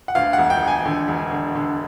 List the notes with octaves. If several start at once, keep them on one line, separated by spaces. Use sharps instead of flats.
F#5
D2 F5
E1 F#5
G5
E1
G#5
D3
E1
D3
D3